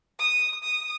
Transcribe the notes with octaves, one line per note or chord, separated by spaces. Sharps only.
D#6
D#6